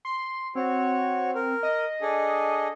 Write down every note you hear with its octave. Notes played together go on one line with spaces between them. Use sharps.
C6
C4 F#4 C#5
A#4
D#5
D4 G#4 A4